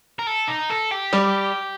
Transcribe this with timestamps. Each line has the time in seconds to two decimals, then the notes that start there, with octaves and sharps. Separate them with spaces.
0.19 A#4
0.27 A4
0.48 D#4
0.70 A4
0.92 G4
1.13 G3